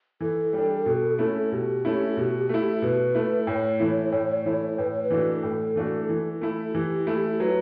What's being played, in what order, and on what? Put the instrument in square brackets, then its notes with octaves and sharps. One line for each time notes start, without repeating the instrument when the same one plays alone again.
[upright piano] E3 [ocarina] A4
[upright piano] G3
D4
B2
A3 C#4 E4
[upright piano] B2 [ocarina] G4
[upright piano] A3 C#4 E4
B2
A3 E4
[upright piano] B2 [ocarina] B4
[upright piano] A3 E4
[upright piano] A2 [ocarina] C#5
[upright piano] E3 A3 E4
A2
E3 A3 E4
[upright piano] A2 [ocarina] B4
[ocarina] C#5
B4
[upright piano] E3 A3 D4 F#4
[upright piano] A2 [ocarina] A4
[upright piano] E3 A3 D4 F#4
E3
A3 E4
[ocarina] F#4
[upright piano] E3 [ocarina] G4
[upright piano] A3 E4
[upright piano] F#3 [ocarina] B4